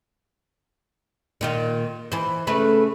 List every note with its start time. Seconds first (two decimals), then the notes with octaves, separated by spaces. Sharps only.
1.41 A#2 D#3 F4
2.12 E3 C5
2.47 C#3 A3 B4